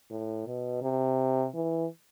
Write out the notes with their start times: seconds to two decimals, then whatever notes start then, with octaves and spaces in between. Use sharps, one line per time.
0.11 A2
0.46 B2
0.82 C3
1.54 E3